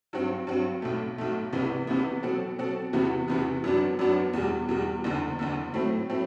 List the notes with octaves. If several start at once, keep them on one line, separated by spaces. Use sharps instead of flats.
G2 F#3 C4 F#4
G2 F#3 C4 F#4
B1 B2 A3
B1 B2 A3
C2 C3 E3 B3
C2 C3 E3 B3
B2 F#3 C4 F#4 A4
B2 F#3 C4 F#4 A4
E2 C3 E3 B3 F#4
E2 C3 E3 B3 F#4
F#2 F#3 B3 D4 F#4
F#2 F#3 B3 D4 F#4
E2 B2 G3
E2 B2 G3
F#1 E2 D3
F#1 E2 D3
A2 F#3 A3 C4
A2 F#3 A3 C4